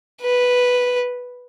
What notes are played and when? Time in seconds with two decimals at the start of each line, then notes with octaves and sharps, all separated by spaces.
0.22 B4